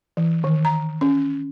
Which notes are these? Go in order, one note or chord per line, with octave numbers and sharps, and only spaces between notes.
E3
D#3
A#5
C#4